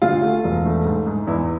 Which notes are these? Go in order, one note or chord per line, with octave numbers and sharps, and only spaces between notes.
D2 F4
A3
E1
A3
G#2
G#2
E2 E4